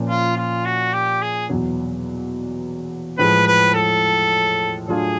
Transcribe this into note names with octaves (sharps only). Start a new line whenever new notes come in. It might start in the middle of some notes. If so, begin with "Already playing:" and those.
Already playing: A#2 F3 A#3 C#4
F4
F4
F#4
G4
G#4
E2 B2 F#3
A2 F3 G#3 B4
B4
A4
A2 F#3 A3 D4 F4 G#4